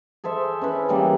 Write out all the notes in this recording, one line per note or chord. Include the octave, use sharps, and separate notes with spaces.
G#4 A4 C5 E5
C#4 E4 B4
C#3 E3 G3 A#3